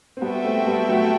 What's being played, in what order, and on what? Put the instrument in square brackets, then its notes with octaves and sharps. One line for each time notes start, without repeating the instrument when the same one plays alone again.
[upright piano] C4
[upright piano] G3 B3 [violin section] F#4 A4 E5 G5
[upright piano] A3 C4
A3
G3 B3
F#3 A3